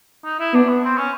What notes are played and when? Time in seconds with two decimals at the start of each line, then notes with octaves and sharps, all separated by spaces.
0.25 D#4
0.39 E4
0.54 B3 D4
0.69 B3
0.84 C4
0.98 C#4